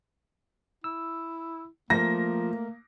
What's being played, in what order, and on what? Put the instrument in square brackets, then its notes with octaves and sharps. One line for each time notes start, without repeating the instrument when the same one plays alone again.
[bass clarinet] E4 [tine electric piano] E6
[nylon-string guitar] F3 [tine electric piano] A3 A#4 [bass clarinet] A#3 [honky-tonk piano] A#6